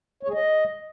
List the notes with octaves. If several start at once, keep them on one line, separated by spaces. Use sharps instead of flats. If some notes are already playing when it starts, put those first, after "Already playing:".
C#5
G#4
D#5